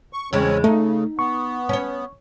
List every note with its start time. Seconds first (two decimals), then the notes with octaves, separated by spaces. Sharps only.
0.13 C#6
0.33 E2 C#3 G#3 C4 C#4 C#5
0.64 C#3 A3 D#4
1.19 B3 C#6
1.69 C#4 C#5